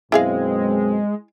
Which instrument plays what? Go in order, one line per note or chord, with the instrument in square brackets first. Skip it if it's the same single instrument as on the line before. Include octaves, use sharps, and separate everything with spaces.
[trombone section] F#2 B2 C4 [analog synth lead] G#3 [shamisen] E4 G#4 F5